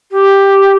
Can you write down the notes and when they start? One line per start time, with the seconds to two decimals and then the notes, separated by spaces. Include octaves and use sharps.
0.11 G4